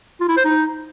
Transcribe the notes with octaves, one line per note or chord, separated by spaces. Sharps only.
F4
E4
C5
D#4